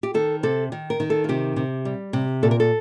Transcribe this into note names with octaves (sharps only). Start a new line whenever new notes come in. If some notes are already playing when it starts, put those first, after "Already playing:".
G4
D#3 A4
C3 A4
D#3
A#4
D#3
A4
F4
C3 G4
C3
G3
C3
A#2 A4
A#4
A4